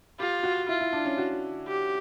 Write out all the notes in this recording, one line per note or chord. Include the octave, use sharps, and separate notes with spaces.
F4 G4
F#4
E4 F4
E4
D4
C#4
F#4
G4